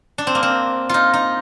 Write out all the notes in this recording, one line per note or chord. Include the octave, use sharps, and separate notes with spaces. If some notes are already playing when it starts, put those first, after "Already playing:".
D4
C4
A#3
C4
D#4 F4
D#4